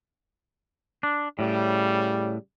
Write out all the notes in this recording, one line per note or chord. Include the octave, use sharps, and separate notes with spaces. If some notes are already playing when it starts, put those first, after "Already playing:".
D4
A2 C#3 G3